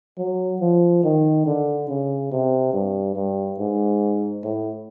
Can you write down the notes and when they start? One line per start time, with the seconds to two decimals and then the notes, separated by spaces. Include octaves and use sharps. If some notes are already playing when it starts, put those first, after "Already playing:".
0.18 F#3
0.61 F3
1.04 D#3
1.46 D3
1.89 C#3
2.32 C3
2.73 G2
3.16 G2
3.59 G#2
4.43 A2